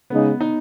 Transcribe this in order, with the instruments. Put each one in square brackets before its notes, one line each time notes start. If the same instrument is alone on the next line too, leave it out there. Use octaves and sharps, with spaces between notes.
[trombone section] C#3 G#3 D#4 [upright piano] B3
[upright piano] D#4